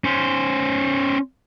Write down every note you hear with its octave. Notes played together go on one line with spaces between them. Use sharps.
C#4 C5